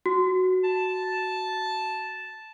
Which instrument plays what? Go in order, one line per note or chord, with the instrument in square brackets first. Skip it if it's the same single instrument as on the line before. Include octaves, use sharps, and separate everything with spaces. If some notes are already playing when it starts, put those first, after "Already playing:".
[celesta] F#4
[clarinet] A5